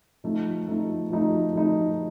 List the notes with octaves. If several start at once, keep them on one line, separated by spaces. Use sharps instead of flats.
F3 A3 D#4
F3 A3 D#4
F3 A3 D#4
F3 A3 D#4